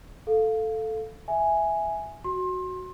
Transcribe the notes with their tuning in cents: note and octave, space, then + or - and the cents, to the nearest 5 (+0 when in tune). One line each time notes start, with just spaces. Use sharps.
A4 +0 F5 +0
E5 +0 G#5 +0
F#4 +0 C6 +25